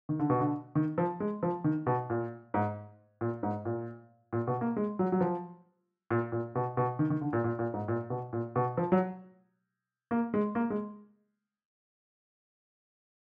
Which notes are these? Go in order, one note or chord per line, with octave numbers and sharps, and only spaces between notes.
D#3
D3
B2
D3
D#3
F3
G#3
F3
D#3
B2
A#2
G#2
A#2
G#2
A#2
A#2
B2
A#3
G#3
F#3
F#3
F3
A#2
A#2
B2
B2
D#3
D#3
D3
A#2
A#2
A#2
G#2
A#2
B2
A#2
B2
F3
F#3
A#3
G#3
A#3
G#3